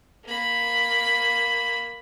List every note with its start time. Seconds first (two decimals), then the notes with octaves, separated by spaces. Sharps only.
0.24 A#3 B5